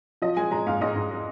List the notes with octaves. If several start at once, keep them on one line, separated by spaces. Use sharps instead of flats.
F3 D#5
G#3 G#5
G#3 A#5
G#2 F5
G#2 D#5
G#2
G#3